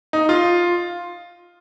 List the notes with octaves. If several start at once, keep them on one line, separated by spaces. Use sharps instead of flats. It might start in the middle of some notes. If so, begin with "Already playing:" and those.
D#4
F4